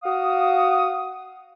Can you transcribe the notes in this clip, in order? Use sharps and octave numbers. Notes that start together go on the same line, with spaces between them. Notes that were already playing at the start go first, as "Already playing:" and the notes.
F#4 F5 D#6